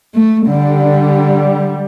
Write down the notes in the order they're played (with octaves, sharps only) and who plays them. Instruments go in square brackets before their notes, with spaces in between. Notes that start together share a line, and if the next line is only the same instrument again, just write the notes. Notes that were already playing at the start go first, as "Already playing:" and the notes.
[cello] A3
[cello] D3 [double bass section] G3